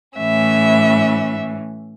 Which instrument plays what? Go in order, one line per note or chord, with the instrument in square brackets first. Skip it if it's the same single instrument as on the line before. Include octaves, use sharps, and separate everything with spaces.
[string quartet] A2 E3 C#4 E5